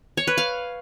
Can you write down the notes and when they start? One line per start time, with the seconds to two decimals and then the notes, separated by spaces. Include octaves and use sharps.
0.17 C#5
0.27 B4
0.38 F5